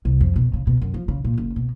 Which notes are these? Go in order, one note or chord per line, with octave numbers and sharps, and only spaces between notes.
C2
F2
B2
C#3
B2
F#2
F3
C#3
A#2
F#1
B2